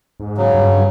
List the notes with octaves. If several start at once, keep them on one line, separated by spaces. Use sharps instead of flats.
G#2
C#3 F#3
G2